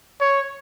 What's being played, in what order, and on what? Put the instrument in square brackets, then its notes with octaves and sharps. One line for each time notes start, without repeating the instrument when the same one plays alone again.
[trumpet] C#5